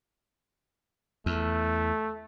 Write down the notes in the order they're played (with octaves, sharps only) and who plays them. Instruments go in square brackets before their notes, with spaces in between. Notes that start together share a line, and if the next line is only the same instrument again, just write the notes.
[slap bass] E2 [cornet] A3